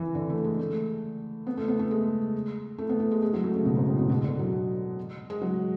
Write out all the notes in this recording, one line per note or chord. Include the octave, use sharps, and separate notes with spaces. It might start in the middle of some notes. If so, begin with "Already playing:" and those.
Already playing: E3
D3
A3
G#3
A3
B3
A3
B3
A3
G#3
A3
B3
A3
G#3
G#3
F#3
A3
C#3
B2
G#2
A2
B2
B2
D3
F#3
G#3
F#3